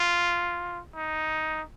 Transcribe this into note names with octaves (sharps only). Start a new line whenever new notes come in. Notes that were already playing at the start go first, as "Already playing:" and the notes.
Already playing: F4
D#4